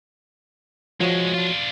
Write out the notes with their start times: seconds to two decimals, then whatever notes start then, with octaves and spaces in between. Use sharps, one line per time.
1.00 F3 G#3 D4 F#4 C#5
1.34 D4 F4